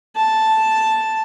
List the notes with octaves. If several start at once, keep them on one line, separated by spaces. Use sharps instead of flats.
A5